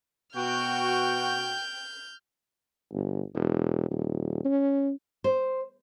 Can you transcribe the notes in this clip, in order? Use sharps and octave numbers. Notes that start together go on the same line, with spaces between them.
B2 F#4 G5 F6 G6
G1
E1
D#1
C#4
C5